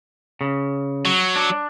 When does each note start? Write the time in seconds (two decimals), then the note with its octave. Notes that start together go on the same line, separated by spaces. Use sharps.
0.41 C#3
1.05 F#3
1.36 D4